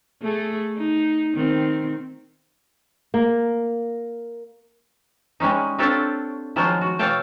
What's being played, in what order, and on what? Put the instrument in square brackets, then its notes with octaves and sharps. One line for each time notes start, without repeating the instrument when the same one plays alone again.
[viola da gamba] A3 G#4 A4
D#4
D#3 C4
[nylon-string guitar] A#3
[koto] G3 G#3 C#4 D#4
C4 D4 F4 G4 A4 C#5
D#3 F3 F#3 G#3 F4 C5
F#4
B2 E3 C#5 F5 G5 A5